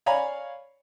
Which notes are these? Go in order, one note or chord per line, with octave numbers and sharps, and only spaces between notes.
C#5 D5 F5 G#5 A#5 B5